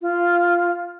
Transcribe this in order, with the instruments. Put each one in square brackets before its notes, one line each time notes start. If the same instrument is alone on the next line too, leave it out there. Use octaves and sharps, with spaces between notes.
[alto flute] F4